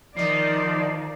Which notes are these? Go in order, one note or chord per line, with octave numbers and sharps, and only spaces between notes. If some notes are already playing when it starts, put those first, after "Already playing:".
D#3 F3 D#4 D5 C7